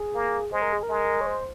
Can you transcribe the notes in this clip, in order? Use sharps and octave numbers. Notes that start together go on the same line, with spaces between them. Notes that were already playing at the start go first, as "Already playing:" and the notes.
Already playing: G#4
A#3
G#3 C5
A#4
G#4
A#4
G#3
C#5
C5